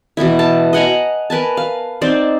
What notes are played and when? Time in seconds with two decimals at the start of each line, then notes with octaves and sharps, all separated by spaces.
0.17 B2 E3 B3 E4
0.39 A5
0.73 D#5 F#5 G#5 A#5
1.30 A#4 B4 G#5 A5
1.57 F5
2.02 C4 D#4 C5 D5